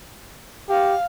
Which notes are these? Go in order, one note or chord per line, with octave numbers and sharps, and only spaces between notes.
G4 F5